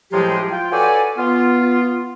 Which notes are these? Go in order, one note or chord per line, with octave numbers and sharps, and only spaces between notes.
A2 F3 F#3 G#3 F4 G4
F4 G5
F#4 A4 B4 C#5 D5 G#5
B3 F4